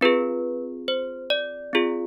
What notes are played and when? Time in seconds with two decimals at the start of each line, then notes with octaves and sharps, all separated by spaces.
0.01 C4 F4 G#4 B4
0.88 C5
1.30 D5
1.73 C4 F4 G#4